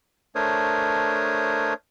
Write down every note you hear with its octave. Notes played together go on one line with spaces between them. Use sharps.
A3 D4 A#4 C5 C#5 D#6